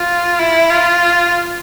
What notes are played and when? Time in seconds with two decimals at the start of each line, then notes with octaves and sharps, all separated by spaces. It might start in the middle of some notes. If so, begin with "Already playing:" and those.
Already playing: F4
0.39 E4
0.71 F4